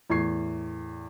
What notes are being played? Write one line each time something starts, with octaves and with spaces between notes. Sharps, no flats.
E2 A2 C#6 G#6 C7